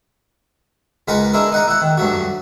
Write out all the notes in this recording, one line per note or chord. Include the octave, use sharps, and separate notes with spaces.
C#2 G#3 A#4 B4 F#5 A#5
G#3 D4 E4 A#4
D#4 F#5 A#5
E4 F#5
D#3
G2 F#3 A3 F#4